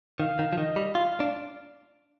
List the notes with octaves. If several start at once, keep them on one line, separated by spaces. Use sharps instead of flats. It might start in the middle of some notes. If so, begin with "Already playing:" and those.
D#3 F5
D#3
F3
D#3 D#5
G3
F4 F5
D4